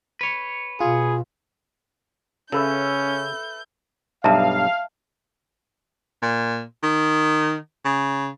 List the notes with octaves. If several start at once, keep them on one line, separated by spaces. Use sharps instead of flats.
B4 C#5
B2 F4 G#4
C#3 C#4 A4 B4 E5 G6
B1 G2 E5 F5 A5 A#5
A#2
D#3
C#3